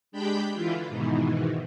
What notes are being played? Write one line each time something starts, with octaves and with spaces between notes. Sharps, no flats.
G#3 D4 G4 G5 B5 G6
D3 E3 E4 F4
G#2 B2 D#3 E3